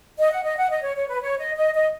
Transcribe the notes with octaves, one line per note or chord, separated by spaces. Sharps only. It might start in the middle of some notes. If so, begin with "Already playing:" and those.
D#5
F#5
D#5
F#5
D#5
C#5
C#5
B4
C#5
D#5
D#5
D#5